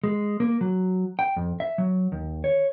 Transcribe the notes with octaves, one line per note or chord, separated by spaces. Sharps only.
G#3
A#3
F#3
G5
F2
E5
F#3
D#2
C#5